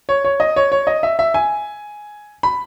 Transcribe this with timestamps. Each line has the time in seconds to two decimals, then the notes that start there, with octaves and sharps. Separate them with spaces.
0.09 C#5
0.25 C#5
0.40 D#5
0.56 C#5
0.72 C#5
0.87 D#5
1.03 E5
1.19 E5
1.34 G#5
2.43 B5